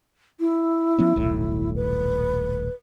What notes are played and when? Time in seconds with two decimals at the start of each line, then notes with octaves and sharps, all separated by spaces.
0.40 E4
0.99 F3 B3 C#4
1.16 D#1 B1 A2
1.76 B4